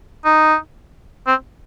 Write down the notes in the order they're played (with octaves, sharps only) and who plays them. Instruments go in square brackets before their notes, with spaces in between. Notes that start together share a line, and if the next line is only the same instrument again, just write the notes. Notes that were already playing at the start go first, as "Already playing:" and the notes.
[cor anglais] D#4
C4